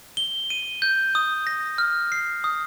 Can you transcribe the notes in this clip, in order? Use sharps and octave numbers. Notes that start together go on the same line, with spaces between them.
G7
D#7
G6
D#6
A#6
F6
C7
D#6